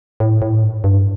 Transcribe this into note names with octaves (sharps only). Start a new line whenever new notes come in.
A2
A2
G#2
G2